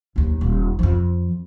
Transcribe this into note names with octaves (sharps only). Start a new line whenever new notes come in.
F#1 D#2
D#1
F2 F3